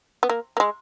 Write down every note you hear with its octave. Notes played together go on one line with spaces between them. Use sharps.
B3
A#3
A#3
G#3